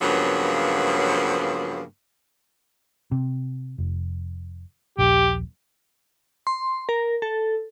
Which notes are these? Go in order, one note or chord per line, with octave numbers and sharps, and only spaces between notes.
G2 C#3 F3 F#3 A#3 B3
C3
F1
D#1 A#1 G4
C6
A#4
A4